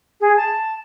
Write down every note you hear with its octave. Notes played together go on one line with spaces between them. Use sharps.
G#4
A5